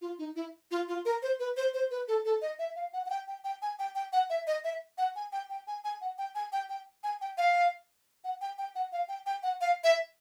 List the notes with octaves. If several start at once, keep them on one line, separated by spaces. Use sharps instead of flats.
F4
D#4
E4
F4
F4
A#4
C5
B4
C5
C5
B4
A4
A4
D#5
E5
F5
F#5
F#5
G5
G5
G5
G#5
G5
G5
F#5
E5
D#5
E5
F#5
G#5
G5
G5
G#5
G#5
F#5
G5
G#5
G5
G5
G#5
G5
F5
F#5
G5
G5
F#5
F5
G5
G5
F#5
F5
E5